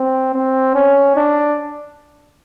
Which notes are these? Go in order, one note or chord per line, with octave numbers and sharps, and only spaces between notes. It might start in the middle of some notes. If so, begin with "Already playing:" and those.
Already playing: C4
C4
C#4
D4